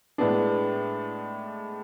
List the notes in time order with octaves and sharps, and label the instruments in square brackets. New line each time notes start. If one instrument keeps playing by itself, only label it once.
[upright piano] A2 G#3 B3 D4